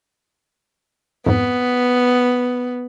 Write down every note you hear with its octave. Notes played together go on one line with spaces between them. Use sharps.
F2 G#2 B3